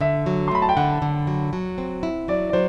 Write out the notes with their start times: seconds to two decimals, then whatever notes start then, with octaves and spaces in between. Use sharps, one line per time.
0.01 D3 E5
0.26 F#3
0.48 C6
0.51 A3 B5
0.62 A5
0.69 G5
0.77 D3 F#5
1.02 D3
1.27 F#3
1.53 F#3
1.78 C4
2.03 E4
2.28 F#3 D5
2.50 D5
2.53 F#3 C5